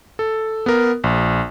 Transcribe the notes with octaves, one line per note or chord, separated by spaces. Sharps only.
A4
B3 A#4
A#1